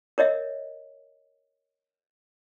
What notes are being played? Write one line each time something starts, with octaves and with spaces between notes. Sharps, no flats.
A#4 C#5 D#5 E5